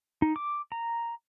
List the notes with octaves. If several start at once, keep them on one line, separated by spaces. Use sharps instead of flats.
D#4
D6
A#5